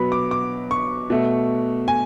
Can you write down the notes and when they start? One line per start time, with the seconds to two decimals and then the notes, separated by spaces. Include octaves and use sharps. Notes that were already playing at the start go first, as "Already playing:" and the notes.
Already playing: B2 F#3 B3 B5
0.12 D6
0.31 D6
0.71 C#6
1.10 B2 A3
1.88 G#5